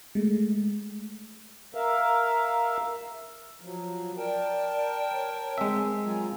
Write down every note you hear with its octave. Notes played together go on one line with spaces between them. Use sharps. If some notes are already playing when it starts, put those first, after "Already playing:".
G#3 A3
A#4 E5 F5
F3 F#3
A#4 D5 G5 A5
C#5
G#3 C4 E5
F#3 F4 G#5 A#5